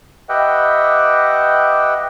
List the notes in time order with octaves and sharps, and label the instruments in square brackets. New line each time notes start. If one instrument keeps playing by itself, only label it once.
[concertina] G4 B4 D#5 E5 F#5 G5